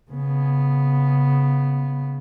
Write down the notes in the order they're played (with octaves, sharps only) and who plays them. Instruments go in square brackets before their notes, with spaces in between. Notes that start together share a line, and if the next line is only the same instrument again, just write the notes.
[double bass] C#3 B3